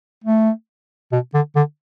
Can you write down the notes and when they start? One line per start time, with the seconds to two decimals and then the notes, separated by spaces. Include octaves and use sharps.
0.24 A3
1.12 B2
1.34 D3
1.56 D3